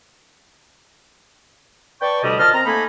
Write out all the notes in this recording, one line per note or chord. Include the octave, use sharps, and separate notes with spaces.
B4 D5 G5 A5 C#6
D2 C3 G3 D#5
A#2 C5 D#5 A5 F6
C4 A#5
A3 A#3 D#4 G#5 B5